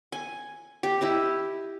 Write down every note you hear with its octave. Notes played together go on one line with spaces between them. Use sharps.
G#5
G4
E4 G4 D#5